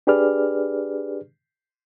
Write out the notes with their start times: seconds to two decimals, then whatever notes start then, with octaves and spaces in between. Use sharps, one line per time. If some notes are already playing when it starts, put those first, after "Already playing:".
0.07 D4 G4 G#4 B4 D5 F6